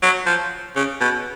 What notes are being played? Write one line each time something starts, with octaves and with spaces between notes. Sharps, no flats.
F#3
F3
C#3
B2